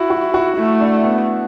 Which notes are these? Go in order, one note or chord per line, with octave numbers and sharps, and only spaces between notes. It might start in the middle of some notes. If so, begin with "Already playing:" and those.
Already playing: E4 F#4
F#4
F#4
A3 E4
D4
B3